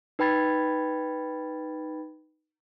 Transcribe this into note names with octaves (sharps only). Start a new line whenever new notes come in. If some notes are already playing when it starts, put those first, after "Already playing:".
D#4 B4 G5 B5 G#6 A6